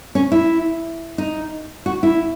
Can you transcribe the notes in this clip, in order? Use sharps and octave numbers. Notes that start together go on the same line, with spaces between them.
C#4
E4
D#4
F#4
E4